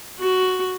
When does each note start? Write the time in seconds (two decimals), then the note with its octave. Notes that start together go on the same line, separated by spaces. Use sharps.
0.20 F#4